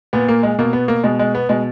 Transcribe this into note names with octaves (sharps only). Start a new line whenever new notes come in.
A#2 B3
A#3
G#3
B2 A#3
B3
A#3
B2 G#3
G#3
B3
B2 G#3